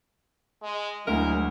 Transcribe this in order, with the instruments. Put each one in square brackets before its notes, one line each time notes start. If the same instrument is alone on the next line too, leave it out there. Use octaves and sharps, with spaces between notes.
[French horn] G#3
[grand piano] D2 [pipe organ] F#3 G#3 E4 [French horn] G#4 [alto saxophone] A#4